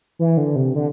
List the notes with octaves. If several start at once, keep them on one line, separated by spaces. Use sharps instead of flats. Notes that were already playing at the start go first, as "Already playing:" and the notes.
E3
D3
C3
D3